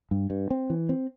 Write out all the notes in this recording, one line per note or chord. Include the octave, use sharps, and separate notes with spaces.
G2
G2
C4
E3
C4